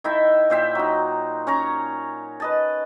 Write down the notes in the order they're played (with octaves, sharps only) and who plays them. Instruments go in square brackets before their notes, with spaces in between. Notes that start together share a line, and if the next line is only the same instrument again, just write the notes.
[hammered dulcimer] D#3 E4 E5 G5
A#2 C5 E5 G5
F#3 D#4
C#4 C#5 A#5
B4 D#5 A5